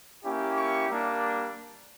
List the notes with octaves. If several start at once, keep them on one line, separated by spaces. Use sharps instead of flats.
A#3 C#4 E4 G4
C#6
G3 A#3 D4